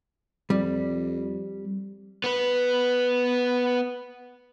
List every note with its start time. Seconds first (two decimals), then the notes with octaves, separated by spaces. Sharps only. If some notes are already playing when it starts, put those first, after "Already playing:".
0.50 F2 G3
2.24 B3 B4